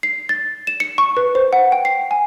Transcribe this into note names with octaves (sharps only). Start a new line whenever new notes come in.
C7
A6
E7
C#7
C#6
B4
C5
F#5
G5
C7
G#5